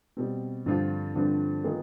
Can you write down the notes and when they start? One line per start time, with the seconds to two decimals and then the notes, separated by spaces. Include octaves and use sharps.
0.17 B2 G3 C4
0.66 G2 D3 F3 C4 F4
1.15 G2 D3 F3 C4 F4
1.64 D#3 B3 F4 G#4